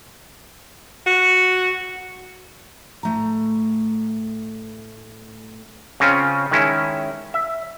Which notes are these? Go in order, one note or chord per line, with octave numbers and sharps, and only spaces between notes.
F#4
A2 A3 A#5
C#3 C4 C#4 F4
D#3 G#3 C#4 E4
E5